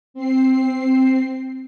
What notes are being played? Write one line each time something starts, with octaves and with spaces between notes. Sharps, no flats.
C4 C7